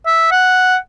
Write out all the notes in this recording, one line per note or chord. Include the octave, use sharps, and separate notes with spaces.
E5
F#5